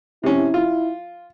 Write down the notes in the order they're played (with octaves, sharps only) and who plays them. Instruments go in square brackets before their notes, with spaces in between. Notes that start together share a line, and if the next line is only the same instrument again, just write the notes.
[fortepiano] C3 C#4 [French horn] E4
[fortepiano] F4